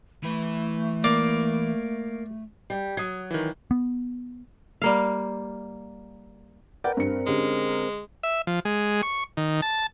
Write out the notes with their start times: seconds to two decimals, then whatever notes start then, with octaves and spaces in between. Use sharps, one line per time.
0.24 E3 A3 B4
1.04 A#3 D5
2.70 G3
2.97 F#3 D#6 G#6
3.31 D#3 E3
3.71 B3
4.82 G3 A#3 F5
6.84 A#4 B4 D5 F#5 G5 D6
6.97 G2 C4 A#4 C#7
7.27 D3 G#3 C#4 G4
8.23 E5
8.47 F3
8.65 G#3
9.03 C#6
9.37 D#3
9.62 A5